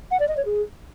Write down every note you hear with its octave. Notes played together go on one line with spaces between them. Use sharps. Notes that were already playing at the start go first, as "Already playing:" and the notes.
F#5
D5
D#5
C#5
G#4